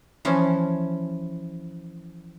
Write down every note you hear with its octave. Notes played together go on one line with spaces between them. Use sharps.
E3 F3 C#4